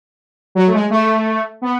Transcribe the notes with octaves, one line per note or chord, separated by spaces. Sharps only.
F#3
A3
G#3
A3
B3